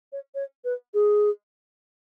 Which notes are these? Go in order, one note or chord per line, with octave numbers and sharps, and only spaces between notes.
C#5
C#5
B4
G#4